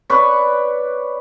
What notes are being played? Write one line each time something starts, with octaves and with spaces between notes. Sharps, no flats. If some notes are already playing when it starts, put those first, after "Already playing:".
B4 C#5 D5 C#6